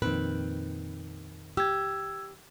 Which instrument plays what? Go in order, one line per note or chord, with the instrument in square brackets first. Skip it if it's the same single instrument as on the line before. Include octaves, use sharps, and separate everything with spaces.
[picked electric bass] F2 A#2 [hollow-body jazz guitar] D#3 C4 [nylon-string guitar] B4
[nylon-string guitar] G4 [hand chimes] E6 G#6